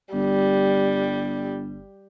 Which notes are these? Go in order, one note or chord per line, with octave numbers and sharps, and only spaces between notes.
G1 G3